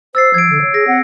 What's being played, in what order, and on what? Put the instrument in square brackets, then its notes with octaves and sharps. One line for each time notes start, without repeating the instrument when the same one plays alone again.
[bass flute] C5 [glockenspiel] E6 A6 C7
[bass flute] F3 [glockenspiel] G#6 D7
[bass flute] D3
C#5
[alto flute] G#4 [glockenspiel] A#6
[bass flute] C4 [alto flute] F#5